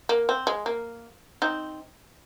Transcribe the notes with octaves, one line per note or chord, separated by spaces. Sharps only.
A#3
C4
G#3
A#3
C4 D#4